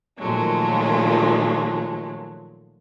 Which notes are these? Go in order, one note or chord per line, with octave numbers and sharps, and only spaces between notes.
A#2 D#3 F3 F#3 G#3 A3